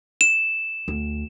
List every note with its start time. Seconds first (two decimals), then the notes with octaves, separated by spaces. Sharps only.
0.21 E7
0.88 D2